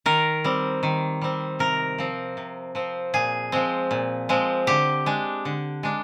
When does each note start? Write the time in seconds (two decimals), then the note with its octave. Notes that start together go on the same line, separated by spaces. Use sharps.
0.06 D#3 A#4
0.44 G3 C4
0.83 D#3
1.21 G3 C4
1.59 C3 A#4
1.98 F3 C4
2.37 C3
2.75 F3 C4
3.14 A#2 G#4
3.52 F3 G#3 C4
3.91 A#2
4.29 F3 G#3 C4
4.67 D3 G4
5.06 G#3 D4
5.45 D3
5.83 G#3 D4